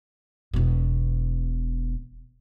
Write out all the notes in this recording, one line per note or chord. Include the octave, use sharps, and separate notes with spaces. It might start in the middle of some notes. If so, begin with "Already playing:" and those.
E1 B2